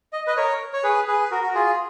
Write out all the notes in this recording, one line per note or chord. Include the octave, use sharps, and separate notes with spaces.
D#5
B4 D#5
A#4 C#5
C#5
G#4 B4
G#4 B4
F#4 A#4
F#4
F4 G#4